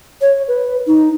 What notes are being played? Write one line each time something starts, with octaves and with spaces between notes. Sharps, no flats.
C#5
B4
D#4